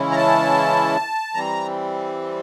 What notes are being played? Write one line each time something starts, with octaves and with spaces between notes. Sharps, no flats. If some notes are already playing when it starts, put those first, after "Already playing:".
Already playing: C#3 E3 G#3 C#4 E4
A#5
A5
E3 G3 C4 A#5